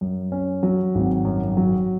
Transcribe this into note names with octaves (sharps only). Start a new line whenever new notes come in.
F#2
C#4
F#3
G#1
F#2
F#3